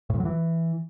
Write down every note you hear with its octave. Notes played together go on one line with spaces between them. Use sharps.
A2
F2
F#3
E3